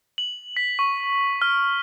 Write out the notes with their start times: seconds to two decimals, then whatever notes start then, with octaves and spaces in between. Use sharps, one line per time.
0.18 F#7
0.57 B6
0.79 C#6
1.42 F6